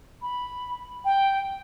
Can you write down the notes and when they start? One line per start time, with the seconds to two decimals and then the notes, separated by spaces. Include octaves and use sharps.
0.22 B5
1.05 G5